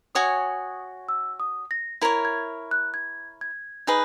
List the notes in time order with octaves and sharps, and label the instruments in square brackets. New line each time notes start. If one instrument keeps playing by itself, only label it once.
[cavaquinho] F#4 C#5 G#5 [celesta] D#6
[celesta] E6
D#6
A#6
[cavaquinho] E4 A#4 C#5
[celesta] G#6
F#6
G#6
G#6
[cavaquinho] D#4 G#4 B4